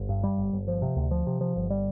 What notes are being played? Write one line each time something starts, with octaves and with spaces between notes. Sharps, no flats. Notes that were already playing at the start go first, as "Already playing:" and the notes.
Already playing: G1
G2
G3
G1
G1
F3
C3
D2
F3
C3
F3
G1
G3